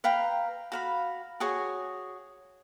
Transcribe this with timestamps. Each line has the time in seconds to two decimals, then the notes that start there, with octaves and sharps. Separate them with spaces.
0.04 B4 F5 G5 A#5
0.72 F#4 F5 B5
1.40 F#4 G#4 C#5 G#5